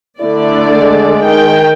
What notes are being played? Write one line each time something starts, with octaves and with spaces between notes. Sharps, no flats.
D3 A3 E4 D5
G#3
D#3 G5